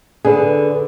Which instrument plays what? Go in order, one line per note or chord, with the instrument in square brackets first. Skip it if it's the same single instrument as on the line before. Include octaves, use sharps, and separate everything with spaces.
[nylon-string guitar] D3 [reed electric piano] G#4 B4